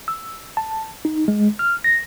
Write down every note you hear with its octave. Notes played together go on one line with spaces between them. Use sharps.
E6
A5
D#4
G#3
F6
A#6